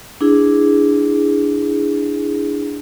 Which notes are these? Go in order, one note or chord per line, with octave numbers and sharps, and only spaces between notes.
D4 E4 G#4